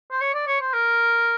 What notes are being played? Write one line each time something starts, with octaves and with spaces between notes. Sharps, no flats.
C5
C#5
D5
C#5
C5
A#4